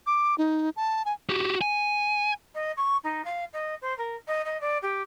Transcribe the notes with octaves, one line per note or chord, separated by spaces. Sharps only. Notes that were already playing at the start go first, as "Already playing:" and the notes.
D6
D#4
A5
G#5
F#4 G4
G#5
D#5
C#6
D#4
F5
D#5
C5
A#4
D#5
D#5
D5
G4